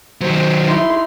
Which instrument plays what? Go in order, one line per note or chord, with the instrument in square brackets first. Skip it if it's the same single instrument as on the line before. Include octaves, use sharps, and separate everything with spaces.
[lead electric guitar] D#3 F#3 [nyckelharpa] C5
[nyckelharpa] D#4 [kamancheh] E4 C6